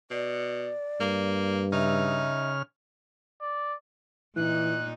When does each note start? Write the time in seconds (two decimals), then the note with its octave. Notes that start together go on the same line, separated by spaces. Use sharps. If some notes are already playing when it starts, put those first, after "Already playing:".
0.11 B2 D5
1.00 G2 A#3
1.72 C#3 D#4 E5 F6
3.41 D5
4.36 A#2 E3 D#4 F#6